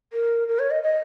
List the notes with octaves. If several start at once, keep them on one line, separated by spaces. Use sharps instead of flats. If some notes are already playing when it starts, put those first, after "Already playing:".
A#4
A#4
C#5
D#5
D#5